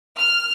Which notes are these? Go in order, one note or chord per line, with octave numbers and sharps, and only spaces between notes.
F6